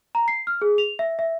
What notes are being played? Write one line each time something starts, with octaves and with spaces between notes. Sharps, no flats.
A#5
C7
F6
G#4
F7
E5
E5